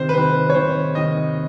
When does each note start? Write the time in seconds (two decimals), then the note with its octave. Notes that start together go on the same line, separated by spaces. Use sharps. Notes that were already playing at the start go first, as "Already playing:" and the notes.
Already playing: C3 D#3 C5
0.09 B4
0.14 C3 D#3 C5
0.50 C#5
0.54 C3 D#3 C5
0.95 C3 D#3 D#5